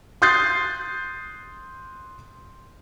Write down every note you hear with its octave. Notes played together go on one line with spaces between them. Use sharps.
C6 D#6 F#6 G6 A6 C7